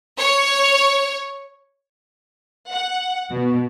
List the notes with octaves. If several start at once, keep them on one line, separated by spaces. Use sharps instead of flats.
C#5
F#5
B2